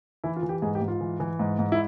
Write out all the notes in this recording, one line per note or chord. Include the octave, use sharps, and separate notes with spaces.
E3 E4
F4
E3
G4
G#2 G#4
G4
G#2
F4
E3
E3
G#2
G#2
E4